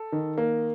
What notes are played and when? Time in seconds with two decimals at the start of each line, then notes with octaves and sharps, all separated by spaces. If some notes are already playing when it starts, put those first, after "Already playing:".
Already playing: A4
0.12 D#3
0.38 A#3